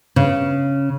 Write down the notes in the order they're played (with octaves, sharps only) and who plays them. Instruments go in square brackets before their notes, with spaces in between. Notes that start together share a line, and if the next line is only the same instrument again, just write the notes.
[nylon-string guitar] C#3